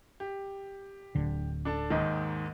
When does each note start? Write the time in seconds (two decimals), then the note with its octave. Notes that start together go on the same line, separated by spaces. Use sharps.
0.20 G4
1.15 D1 D3
1.65 D4 A4 A5
1.90 D#2 G#2 D#3